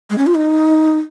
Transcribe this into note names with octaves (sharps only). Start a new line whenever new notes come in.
G#3
C#4
F4
D#4